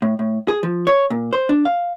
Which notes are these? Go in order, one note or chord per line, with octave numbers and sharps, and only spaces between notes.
A2
A2
G#4
F3
C#5
A#2
C5
D4
F5